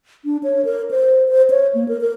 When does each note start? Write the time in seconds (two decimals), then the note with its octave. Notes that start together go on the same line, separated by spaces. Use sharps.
0.25 D4
0.43 C#5
0.65 A#4
0.91 C5
1.28 C5
1.50 C#5
1.75 A#3
1.88 A#4
2.01 A#4